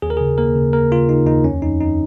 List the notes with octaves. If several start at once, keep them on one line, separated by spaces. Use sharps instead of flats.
D#2 G#4
A#4
C#3 G#4
A#3 A#4
C#3
A#3 A#4
C#3 F4
C#3 D#4
D#2 D#4
F2 C#4
F2 D#4
F2 D#4